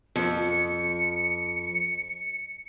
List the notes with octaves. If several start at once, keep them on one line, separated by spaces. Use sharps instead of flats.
F2 C#7